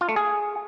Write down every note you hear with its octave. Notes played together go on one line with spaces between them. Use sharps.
F4
A3
G#4